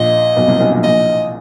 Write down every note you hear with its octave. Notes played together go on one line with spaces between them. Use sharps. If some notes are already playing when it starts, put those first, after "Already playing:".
Already playing: A#1 A#2 D#5
B1 B2
C2 C3
B1 B2
A#1 A#2
A#1 A#2 D#5